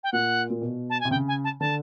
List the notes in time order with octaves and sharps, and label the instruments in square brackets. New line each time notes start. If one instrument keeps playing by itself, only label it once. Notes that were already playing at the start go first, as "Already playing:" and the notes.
[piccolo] G5
[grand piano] A#2 [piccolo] F#5
[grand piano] A#2
B2
[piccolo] A5
[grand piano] C3 [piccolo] G#5
[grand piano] C#3 [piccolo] G5
[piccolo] G#5
A5
[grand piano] D3 [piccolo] A5